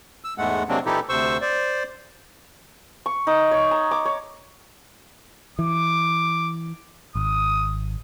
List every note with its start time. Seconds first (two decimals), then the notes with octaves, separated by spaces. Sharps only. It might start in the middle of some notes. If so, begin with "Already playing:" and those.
0.24 E6
0.38 E2 G#2 G#3 A3 F#5
0.69 C3 F#3 G#3 A#3 C4 D4
0.86 A#2 E3 D#4 E4 G4 A4
1.09 D2 C3 C5 C#6 E6
1.41 C5 D5
3.06 C#6
3.27 D#4
3.51 C#5
3.71 A#5
3.91 D6
4.05 C#5
5.59 E3 D6
7.15 G#1 D#6